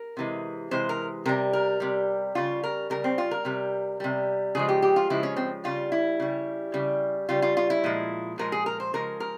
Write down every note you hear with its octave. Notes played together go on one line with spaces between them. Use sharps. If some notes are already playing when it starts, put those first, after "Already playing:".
Already playing: A#4
C3 E3 G#3
C3 E3 G#3 C5
A#4
C3 G3 A#4
A#4
C3 G3
C#3 G3 F4
A#4
C#3 G3 A#4
C4
F4
A#4
C3 G3
C3 G3
C#3 F3 G#3 G#4
G4
G4
F4
C#3 F3 G#3 E4
C#4
C4
C#3 G3 F4
E4
C#3 G3
C#3 G3
C#3 G3 F4
F4
F4
E4
A#2 F3 G#3
A#2 F3 G#3 A#4
G#4
A#4
C5
C#3 F3 G#3 A#4
A#4